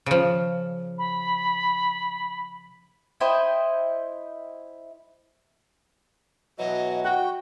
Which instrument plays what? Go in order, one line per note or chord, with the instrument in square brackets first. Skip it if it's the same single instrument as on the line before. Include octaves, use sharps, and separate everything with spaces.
[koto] C#3 F3
[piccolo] B5
[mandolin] E4 C5 D#5 G5
[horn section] B2 E3 F#3 [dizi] D#5
[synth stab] F#4 [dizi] G5